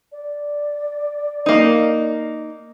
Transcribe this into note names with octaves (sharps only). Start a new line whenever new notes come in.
D5
A#3 D#4